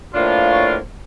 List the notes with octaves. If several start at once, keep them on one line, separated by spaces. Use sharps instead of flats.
A2 F3 A#3 D4 F4
C#5